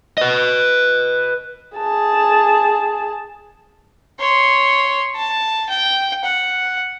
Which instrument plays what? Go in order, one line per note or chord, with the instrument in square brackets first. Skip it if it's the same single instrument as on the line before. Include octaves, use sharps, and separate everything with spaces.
[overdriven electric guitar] B4 D#5
[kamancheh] G#4 A5
[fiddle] C#5 C6
A5
G5
F#5